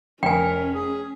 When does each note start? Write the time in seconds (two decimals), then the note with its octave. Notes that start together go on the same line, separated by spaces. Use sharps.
0.23 F1 C#4 A#4 G5 G#5 B6
0.73 G#4